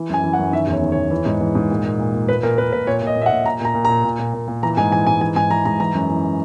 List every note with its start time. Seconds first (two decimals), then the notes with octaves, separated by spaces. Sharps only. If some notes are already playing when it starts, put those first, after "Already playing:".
Already playing: E3
0.09 F#2 G#5
0.24 E3
0.33 F#5
0.38 F#2
0.53 D#3 E5
0.67 E2
0.73 C#5
0.82 D#3
0.92 E2 C#5
1.11 E3
1.26 G#2
1.41 E3
1.55 G#2
1.70 A#2
1.85 A#2
1.99 A#2
2.14 A#2
2.29 A#2 B4
2.43 A#2 A#4
2.58 A#2 B4
2.72 A#2 B4
2.87 A#2 C#5
3.02 A#2 D#5
3.16 A#2
3.22 E5
3.26 F#5
3.31 A#2
3.45 A#2 A#5
3.60 A#2 A#5
3.75 A#2
3.85 A#2 A#5
4.04 A#2
4.19 A#2
4.33 A#2
4.48 A#2
4.63 E3 A#5
4.77 G#2 G#5
4.91 E3 G#5
5.07 G#2 G#5
5.21 E3 G#5
5.36 G#2 G#5
5.50 E3 A#5
5.65 G#2 A#5
5.80 E3 A#5
5.94 F#2
6.09 E3